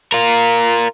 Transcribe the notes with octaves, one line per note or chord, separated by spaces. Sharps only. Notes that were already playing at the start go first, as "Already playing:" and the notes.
F4 A#4